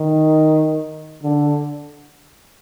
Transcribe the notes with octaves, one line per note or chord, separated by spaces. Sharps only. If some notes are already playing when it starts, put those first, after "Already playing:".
Already playing: D#3
D3